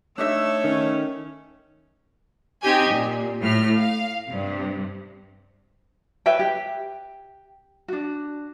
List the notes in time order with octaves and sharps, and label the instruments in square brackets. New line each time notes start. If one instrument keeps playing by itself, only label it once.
[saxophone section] A3 C#5 [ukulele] D4 D#4 E5 [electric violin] E6
[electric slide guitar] D#3 [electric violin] C#4
[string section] C4 D#4 G4 G5 G#5
A#2
A2 F6
F5
G2 C3
[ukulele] B4 C#5 E5 G5
G4
D4 F#4